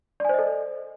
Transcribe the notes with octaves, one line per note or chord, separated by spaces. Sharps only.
A4 C5 D5 D#5 G#5